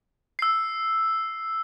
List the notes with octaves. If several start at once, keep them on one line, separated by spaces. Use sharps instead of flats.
E6 C7